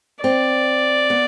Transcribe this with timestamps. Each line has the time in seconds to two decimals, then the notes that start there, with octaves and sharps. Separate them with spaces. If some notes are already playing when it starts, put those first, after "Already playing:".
0.23 C4 D5
1.10 B3